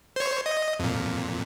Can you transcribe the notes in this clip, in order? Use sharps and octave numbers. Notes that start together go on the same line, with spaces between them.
C5 C#5
D#5
F2 A#2